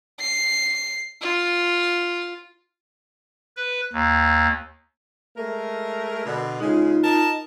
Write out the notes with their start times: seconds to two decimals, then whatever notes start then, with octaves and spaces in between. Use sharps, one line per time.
0.20 C7
1.21 F4
3.57 B4
3.93 D#2
5.36 G#3 A3 A#4
6.26 B2 D3
6.60 C#3 G#3 D#4 F4
7.03 A#4 D#5 A5